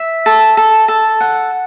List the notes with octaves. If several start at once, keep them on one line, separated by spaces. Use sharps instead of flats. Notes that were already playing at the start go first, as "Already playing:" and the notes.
Already playing: E5
A4
A4
A4
F#5